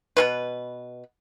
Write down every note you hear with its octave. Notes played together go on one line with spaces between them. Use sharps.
B2 G#3 B4